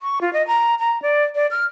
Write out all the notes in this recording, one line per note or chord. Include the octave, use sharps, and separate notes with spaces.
C#6
F4
D#5
A#5
A#5
D5
D5
F6